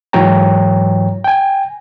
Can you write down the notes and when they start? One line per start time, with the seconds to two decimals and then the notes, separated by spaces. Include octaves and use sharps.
0.13 G#2 E3 F#3 C#5 G5 A#5
1.24 G5 G#5